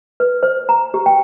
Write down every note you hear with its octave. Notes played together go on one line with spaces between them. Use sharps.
B4
C5
A#5
G4
G5